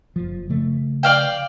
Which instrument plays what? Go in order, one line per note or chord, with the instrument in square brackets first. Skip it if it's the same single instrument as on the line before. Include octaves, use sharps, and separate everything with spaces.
[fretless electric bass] F#1 F3
C#3 F3 A3
[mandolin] D5 F5 G5